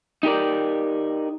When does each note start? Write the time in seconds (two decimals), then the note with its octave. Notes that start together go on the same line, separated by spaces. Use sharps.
0.23 D#4 G4 A#4 D5